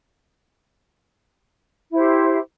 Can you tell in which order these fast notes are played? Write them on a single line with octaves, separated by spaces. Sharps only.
E4 C5 G4